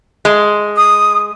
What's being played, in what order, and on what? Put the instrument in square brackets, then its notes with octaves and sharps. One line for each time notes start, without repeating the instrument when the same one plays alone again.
[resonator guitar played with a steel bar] G#3
[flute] D#6